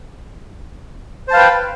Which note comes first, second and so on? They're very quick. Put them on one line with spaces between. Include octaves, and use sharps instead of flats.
C5 A5 F5 B4 G5